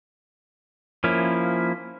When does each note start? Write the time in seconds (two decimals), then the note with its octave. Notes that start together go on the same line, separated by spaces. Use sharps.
1.04 F3 A#3 C#4 E4